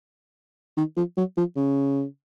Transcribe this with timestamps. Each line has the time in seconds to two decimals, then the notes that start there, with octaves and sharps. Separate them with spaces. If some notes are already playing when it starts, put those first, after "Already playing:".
0.77 D#3
0.97 F3
1.17 F#3
1.37 F3
1.56 C#3